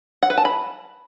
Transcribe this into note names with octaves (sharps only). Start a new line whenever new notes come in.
F#5
B4
A5
B5